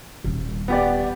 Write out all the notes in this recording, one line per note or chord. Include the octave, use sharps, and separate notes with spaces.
D#1 G3
B3 G4 D5